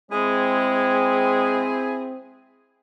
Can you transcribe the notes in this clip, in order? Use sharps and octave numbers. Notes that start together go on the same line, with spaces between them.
G#3 C4 E4 G#4